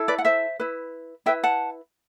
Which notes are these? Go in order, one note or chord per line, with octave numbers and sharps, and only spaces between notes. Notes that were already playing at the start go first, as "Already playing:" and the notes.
Already playing: E4 A4
B4 D5
F#5
C5 E5
E4 B4
E4 B4 E5 G5
F#5 A5